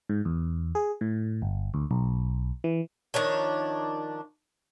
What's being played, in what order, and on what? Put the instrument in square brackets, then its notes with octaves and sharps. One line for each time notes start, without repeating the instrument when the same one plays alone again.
[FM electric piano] G#2
E2
G#4
A2
G1
D2
B1
E3
[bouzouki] D#3 F3 D4 C#5